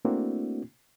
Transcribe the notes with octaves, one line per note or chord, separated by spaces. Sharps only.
A3 A#3 C4 D4 E4 F#4